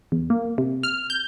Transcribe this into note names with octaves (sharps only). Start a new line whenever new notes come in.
E2
A#3
C3
F6
G6